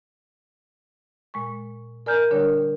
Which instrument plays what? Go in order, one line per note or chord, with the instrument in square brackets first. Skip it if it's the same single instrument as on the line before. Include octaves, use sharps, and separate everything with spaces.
[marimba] A#2 G#3 C#6
A#4 D5 G#5 A#5 F6 G6
D3 G3 D4 A#4 C#5